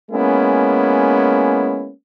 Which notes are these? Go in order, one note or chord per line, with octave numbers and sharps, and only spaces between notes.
G#3 A#3 B3 C#4 E4